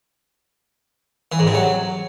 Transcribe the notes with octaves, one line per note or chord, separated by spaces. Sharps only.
E3
G#2
C3
F#3